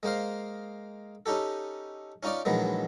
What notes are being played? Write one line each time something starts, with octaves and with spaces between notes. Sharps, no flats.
G#3 A#3 C5 F5
C#4 D#4 G4 A4
C#4 D#4 F4 C#5 D5
A#1 D#3 E3 F#3 G#3